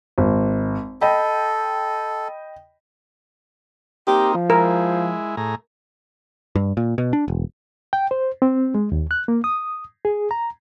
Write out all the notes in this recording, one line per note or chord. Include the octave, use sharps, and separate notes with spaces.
G#1
A4 D#5 G5 B5
A#3 C4 D#4 G4
F3
G#3 E4 A#4
A2 G#4 A#5
G2
A#2
B2
D4
E1
G5
C5
C4
G#3
D#2
F#6
A#3
D#6
G#4
A#5